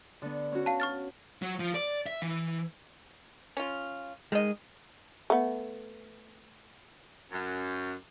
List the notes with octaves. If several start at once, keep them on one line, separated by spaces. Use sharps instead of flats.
D3 B3
C#4 F#4
F5 A5
C#6 F6 A6
F#3
F3
D5
E5
E3
C#4 F4
D#3 G#3 D#5
A3 B3
F#2